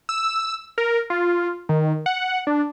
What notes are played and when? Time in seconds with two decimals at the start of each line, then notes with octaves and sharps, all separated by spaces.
0.09 E6
0.78 A#4
1.10 F4
1.69 D#3
2.06 F#5
2.47 D4